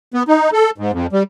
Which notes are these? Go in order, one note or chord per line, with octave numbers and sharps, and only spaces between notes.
B3
D#4
A4
G#2
F2
G3